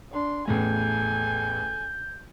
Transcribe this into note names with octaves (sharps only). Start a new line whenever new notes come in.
D4 C6
A1 E2 A2 A4 G#5 G6